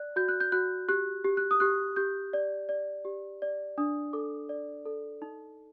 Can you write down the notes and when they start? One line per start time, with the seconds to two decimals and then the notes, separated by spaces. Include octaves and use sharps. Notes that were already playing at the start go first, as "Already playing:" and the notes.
Already playing: D5 F#6
0.16 F#4 G6
0.28 F#6
0.40 G6
0.52 F#4 F#6
0.89 G4 F#6
1.25 G4
1.37 F#6
1.51 D#6
1.60 G4 F#6
1.96 G4 G6
2.33 D5
2.69 D5
3.05 G4
3.42 D5
3.78 D4 D#6
4.13 A4 D6
4.49 D5
4.86 A4
5.22 D#4